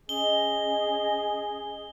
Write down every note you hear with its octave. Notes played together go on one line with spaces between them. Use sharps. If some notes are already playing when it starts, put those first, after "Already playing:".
C#4 G#4 D#5 G7